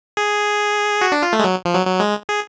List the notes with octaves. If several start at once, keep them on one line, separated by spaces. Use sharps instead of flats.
G#4
F#4
D4
F4
A3
G#3
F#3
F3
F#3
F#3
G#3
G#4